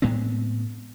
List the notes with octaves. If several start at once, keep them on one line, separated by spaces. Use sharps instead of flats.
A2 G#3 B3 C4